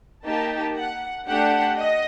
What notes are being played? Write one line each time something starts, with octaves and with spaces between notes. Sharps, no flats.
A#3 D#4 G4 A5
F#5
A3 D4 G4 F#5
D#5